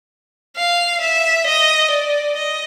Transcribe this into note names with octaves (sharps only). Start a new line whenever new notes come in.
F5
E5
D#5
D5
D#5